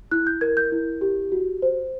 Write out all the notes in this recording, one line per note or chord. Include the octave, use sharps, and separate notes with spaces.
E4 F#6
G6
A#4 G#6
G6
E4
G4
F#4
C5